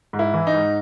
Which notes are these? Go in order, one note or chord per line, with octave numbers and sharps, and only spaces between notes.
G#2
E4
E3
D#4
G#2